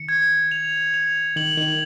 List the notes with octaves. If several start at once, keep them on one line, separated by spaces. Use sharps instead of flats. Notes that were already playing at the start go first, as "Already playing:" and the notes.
Already playing: D#3 C#7
G#6
F7
F7
D#3 F#7
D#3